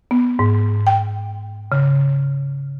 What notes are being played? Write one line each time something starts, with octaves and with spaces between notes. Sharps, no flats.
B3
G#2
G5
C#3